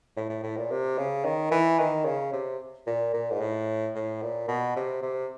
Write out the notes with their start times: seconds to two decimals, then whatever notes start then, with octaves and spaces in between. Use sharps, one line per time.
0.16 A2
0.29 A2
0.43 A2
0.57 A#2
0.71 C3
0.98 C#3
1.25 D#3
1.51 E3
1.79 D#3
2.05 C#3
2.33 C3
2.86 A#2
3.13 A#2
3.31 G#2
3.41 A2
3.95 A2
4.22 A#2
4.48 B2
4.76 C3
5.02 C3